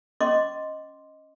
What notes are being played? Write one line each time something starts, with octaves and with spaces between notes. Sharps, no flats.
C#4 D#5 C6 D6